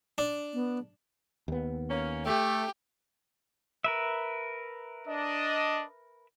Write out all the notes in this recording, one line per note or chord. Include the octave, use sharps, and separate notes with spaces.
D4
B3
D#2 B3
A#3 C#4
A3 G4
A#4 B4 E5
D4 D#5